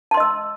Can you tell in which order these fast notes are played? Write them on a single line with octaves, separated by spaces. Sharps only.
A5 C6 D#5 E6